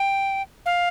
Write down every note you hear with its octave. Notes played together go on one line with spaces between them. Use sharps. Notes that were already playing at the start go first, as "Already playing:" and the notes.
Already playing: G5
F5